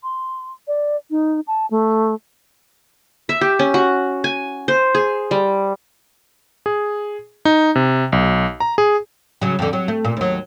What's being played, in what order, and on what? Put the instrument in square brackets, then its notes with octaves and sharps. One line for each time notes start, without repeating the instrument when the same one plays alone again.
[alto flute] C6
D5
D#4
A5
A3
[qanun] E5
G4
C#4
F#4
G#5
C5
G#4
G3
[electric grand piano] G#4
D#4
C3
B1
A#5
G#4
[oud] C#3 F#3
F2 D3
F#3
A3
A#2
D#2 F#3